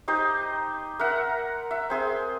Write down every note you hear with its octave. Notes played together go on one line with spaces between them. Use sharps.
D#4 G4 C5 D#5
A#4 E5 F#5
E5
C4 G#4 C6